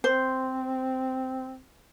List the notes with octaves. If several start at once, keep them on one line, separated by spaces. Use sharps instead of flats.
C4 C5